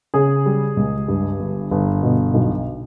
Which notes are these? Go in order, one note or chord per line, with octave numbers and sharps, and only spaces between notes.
C#3 G#4
G3
C#2
G2
G1
G1
B2
B1